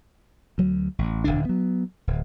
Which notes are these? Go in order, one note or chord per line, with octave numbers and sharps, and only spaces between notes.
D2 F#3
A1
D1 B1 D3 D4
F#3 B3
D1